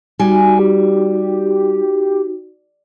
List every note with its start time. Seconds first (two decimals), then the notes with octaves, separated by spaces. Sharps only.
0.19 G3 D#4 F#4 G#5
0.59 G4